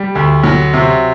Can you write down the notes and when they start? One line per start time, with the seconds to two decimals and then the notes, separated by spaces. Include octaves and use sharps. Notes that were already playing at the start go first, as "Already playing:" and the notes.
Already playing: G3
0.15 D2
0.43 F#3
0.73 C3